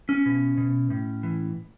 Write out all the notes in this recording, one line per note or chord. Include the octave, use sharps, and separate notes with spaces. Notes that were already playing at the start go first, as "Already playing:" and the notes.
C#4
B2
B2
A2
E3